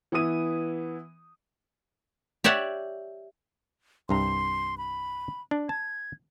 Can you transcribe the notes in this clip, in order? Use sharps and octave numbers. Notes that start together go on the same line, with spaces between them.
E3 B3 E4 D#6 D#7
G4 C#5 D5 E5 F#5
C2 G2 A#5 C6
B5
D4
A5 G#6